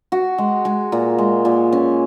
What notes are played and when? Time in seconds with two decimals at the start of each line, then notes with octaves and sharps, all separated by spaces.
0.12 F#4
0.38 G#3
0.65 G#3
0.92 A#2
1.18 G#3
1.45 A#2
1.72 C#4